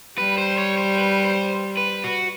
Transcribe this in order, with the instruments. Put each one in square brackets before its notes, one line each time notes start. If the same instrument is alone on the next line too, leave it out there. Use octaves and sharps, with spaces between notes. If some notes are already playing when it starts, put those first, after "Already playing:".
[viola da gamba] G3 [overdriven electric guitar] B4
[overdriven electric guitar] C5
C#5
C5
B4
C5
B4
F#4